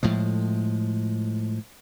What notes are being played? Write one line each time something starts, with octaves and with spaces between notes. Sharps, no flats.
A2 F3 G#3